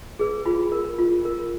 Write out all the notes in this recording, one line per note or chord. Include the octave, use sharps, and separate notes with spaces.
G#4 B4
F4 B5
A#4
F4
A#4